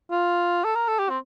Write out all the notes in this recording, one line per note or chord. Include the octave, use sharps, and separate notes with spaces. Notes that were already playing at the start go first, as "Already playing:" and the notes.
F4
A4
A#4
A4
G4
C4